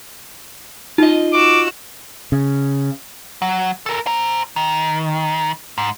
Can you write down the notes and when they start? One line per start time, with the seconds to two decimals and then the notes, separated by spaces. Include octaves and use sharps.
0.98 D#4 F4 D#5
1.33 F#4 D6 E6
2.32 C#3
3.42 F#3
3.86 A4 A#4
4.06 C5 A#5
4.56 D#3
5.78 G#2